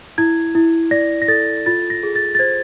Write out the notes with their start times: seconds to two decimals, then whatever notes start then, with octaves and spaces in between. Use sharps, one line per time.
0.18 E4 G#6
0.55 E4
0.91 D5 A#6
1.22 A#6
1.28 A4 A6
1.66 F4 A6
1.90 A#6
2.03 G#4
2.16 A6
2.35 A6
2.39 C5 G#6